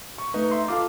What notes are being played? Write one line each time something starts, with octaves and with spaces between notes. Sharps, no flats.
C#6
A3 D#4 B4
E5 C6
F4 A4 F5 D6